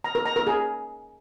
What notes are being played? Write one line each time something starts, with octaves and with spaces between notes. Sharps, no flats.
A#5
A#4
A#5
A#4
G#4